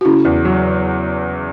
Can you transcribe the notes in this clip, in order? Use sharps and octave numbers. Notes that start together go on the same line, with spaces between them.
F#4
C#3 C#4 E4
E2
F#3